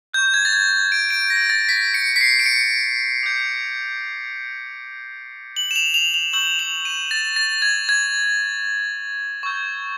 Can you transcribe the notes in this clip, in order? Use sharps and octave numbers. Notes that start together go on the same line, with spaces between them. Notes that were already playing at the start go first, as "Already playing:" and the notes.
C#6 F#6 G6
G#6
A6
G#6
D7
D7
A#6
A6
B6
C#7
B6
C7
D7
C#7
D6 G6
F#7
E7
F7
F7
F7
C#6 E6 G6 F#7
F7
D#7
A6
A6
G#6
G#6
C#6 E6 G6